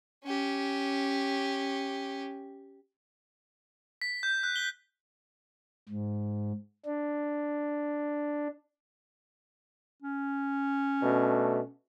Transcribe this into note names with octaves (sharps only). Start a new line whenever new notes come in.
C#4 G4
B6
G6
F#6
G7
G#2
D4
C#4
B2 A3 D4